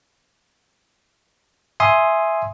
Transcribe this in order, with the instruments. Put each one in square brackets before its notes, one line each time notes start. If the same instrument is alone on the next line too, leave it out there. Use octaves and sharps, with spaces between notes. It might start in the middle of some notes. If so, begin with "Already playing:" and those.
[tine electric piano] E5 G#5 C6 D#6